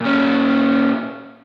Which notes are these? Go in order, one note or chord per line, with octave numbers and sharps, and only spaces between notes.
A#2 C#4